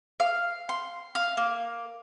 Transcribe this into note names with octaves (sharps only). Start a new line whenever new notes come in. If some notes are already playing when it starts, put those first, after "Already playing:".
F5
C6
F5
A#3